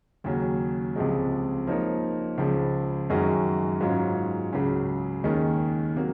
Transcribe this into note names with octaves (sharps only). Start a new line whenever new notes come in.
D#2 C#3 F#3 C#4
C#2 C3 F3 G#3
F3 A#3 D#4 A#4 C#5
C#2 C#3 F3
F#2 D#3 G#3 C#4 F#4
G#2 F#3 C#4 F4
C#2 C#3 F#3 C#4
D#2 D#3 G#3 C#4
C3 F#3 A#3